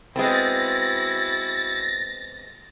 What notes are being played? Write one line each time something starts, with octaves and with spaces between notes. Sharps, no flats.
G#3 B3 C4 E4 F#4 A6 A#6